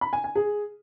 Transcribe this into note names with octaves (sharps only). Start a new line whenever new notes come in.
B5
G#5
G#5
G#4